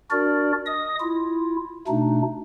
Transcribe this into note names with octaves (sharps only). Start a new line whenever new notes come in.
D4 F#4 A#4 D5
D#5 D#6
E4 F4
B2 A3 D4 D#4